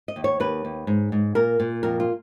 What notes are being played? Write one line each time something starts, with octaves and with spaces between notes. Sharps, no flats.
D#5
D#2
C#5
D#2 B4
D#2
G#2
G#2
A#2 A#4
A#2
F2 A#4
F4